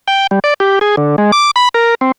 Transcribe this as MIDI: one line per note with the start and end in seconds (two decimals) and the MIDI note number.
0.08 0.27 79
0.31 0.39 55
0.44 0.54 74
0.60 0.79 67
0.81 0.96 68
0.97 1.16 50
1.18 1.31 56
1.32 1.51 86
1.56 1.69 83
1.74 1.95 70
2.01 2.12 60